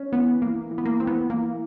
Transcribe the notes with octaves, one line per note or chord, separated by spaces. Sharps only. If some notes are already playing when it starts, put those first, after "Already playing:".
Already playing: C#4
E3 B3
E3 A#3
E3
B3
A#3
E3 C4
B3
E3 A#3